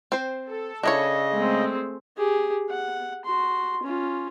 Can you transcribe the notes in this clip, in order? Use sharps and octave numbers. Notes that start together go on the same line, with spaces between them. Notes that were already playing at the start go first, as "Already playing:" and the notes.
C4 C5
A4
C#3 D4 E4 C#5 D#5
G#3 A3 C4
G4 G#4
F#5
F#4 C6
C#4 F4